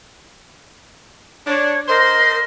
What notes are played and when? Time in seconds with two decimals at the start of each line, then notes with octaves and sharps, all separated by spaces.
1.47 D4 C#5
1.88 A#4 C5 D#5 C6